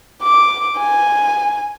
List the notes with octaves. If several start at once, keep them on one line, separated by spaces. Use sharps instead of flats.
D6
G#5